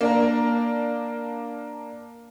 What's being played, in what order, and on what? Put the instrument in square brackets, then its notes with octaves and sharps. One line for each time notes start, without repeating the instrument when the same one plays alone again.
[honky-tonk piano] A#3 D4 A#4